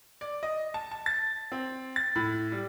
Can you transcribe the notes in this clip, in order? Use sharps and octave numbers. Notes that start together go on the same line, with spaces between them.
D5
D#5
A5
A5
A6
C4
A6
A2
G3